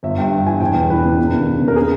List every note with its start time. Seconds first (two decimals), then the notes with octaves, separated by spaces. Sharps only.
0.03 G1 E5
0.18 G2 G5
0.32 G1
0.47 E3 G#5
0.60 E1 G5
0.75 E2
0.90 E3 B4
1.05 C#3
1.18 E1
1.33 D#2
1.47 E1
1.62 C#3
1.68 A#4
1.76 G#4